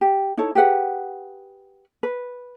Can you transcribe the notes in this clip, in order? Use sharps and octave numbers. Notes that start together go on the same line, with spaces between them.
G4
D#4 E4 A4 C#5
G4 G#4 B4 F#5
B4